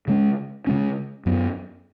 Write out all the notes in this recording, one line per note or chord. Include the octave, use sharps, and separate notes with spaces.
C#3 G#3 C#4
C#3 G#3 C#4
F#2 F#3 B3